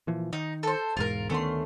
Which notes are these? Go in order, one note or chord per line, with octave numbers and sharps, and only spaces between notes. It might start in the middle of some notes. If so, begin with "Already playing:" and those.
A#2 E3 F3
D#3 D#4
A4 C5
E1 G#2 F4 A#4
D2 D#3 A3 B3 C#4 C6